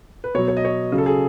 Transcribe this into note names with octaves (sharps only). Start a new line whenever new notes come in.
B4
B2 F#3 C#5
C#5
D#5
C#5
C#3 F#3
A4
G#4